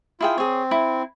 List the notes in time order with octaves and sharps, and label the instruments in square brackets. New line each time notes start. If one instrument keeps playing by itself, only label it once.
[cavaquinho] E4 G#4 G5 [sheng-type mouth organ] F4
[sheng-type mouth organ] C4 [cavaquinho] G#4 C#5
[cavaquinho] E4